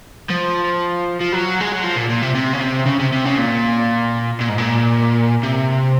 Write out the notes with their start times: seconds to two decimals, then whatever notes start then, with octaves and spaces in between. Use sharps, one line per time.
0.30 F3
1.21 F3
1.33 F#3
1.61 G#3
1.72 F#3
1.84 F3
1.97 A#2
2.10 A#2
2.22 C3
2.35 C3
2.54 C#3
2.61 C3
2.86 C#3
3.00 C3
3.12 C3
3.25 C#3
3.38 A#2
4.40 A#2
4.49 G#2
4.58 A#2
5.43 C3